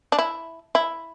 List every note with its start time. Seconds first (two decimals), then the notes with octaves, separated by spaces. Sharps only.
0.12 D4
0.19 E4
0.75 E4